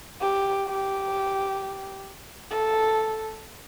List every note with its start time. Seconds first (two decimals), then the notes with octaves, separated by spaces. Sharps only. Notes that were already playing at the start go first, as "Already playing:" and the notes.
0.21 G4
0.67 G4
2.51 A4